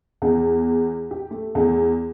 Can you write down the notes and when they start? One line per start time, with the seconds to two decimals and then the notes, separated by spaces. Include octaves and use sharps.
0.22 E2
1.11 G4
1.31 A3
1.55 E2